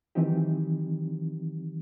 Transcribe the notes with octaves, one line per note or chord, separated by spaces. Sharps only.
D#3 E3 F#3 C4 D#4 G4